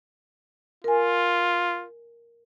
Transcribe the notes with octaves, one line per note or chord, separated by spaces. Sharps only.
F4 A#4 G#5